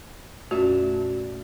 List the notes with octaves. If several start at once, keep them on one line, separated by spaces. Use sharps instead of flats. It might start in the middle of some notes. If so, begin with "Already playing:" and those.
F2 A#2 A3 C#4 F#4 D5 E5